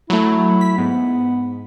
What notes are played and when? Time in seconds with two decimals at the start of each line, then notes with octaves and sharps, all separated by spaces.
0.10 F#3 A3 E4
0.61 B6
0.78 G#2 B3